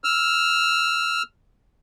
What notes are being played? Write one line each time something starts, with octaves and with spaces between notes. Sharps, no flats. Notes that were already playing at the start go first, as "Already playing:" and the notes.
E6 F6